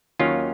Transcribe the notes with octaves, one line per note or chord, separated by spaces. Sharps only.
D#2 D#3 F#3 C#4 F4